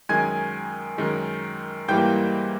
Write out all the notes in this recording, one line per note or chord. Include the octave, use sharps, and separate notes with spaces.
F#2 D#3 G#3 G#5 G#6
F#2 D#3 G#3
G#2 E3 G3 A#3 G5 G6